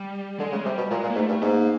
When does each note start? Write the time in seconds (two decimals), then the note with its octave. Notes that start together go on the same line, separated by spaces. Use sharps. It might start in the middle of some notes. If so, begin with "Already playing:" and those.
Already playing: G3
0.39 D3 G#3
0.52 C#3
0.55 G#3
0.64 C3 G3
0.78 B2
0.90 A#2 G#3
1.03 A#2
1.10 A#3
1.16 G#2 A3
1.29 G2
1.42 G#2 A#3